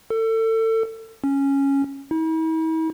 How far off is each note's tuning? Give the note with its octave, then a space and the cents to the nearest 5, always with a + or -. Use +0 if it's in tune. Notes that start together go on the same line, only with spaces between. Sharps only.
A4 +30
C#4 -5
E4 -45